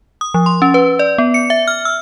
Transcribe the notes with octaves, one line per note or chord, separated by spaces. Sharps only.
D#6
F3
C6
C#4
B4
D5
B3
C#7
E5
F6
E6